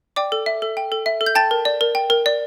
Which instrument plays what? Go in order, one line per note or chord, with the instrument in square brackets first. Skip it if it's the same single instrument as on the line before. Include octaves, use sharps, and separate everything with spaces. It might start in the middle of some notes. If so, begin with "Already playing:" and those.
[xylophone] D5 G5 D6
A4
E5
A4
G5
A4
E5
A4
G6
G5 A5 A6
A#4
D5
A#4
G5
A#4
D5